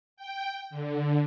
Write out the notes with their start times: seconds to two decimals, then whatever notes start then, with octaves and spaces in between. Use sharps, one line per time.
0.17 G5
0.70 D3